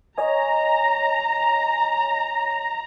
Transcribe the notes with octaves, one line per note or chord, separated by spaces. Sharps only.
C#5 D#5 G#5 A#5